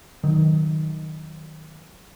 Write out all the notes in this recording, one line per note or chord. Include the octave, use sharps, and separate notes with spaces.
D#3 F#3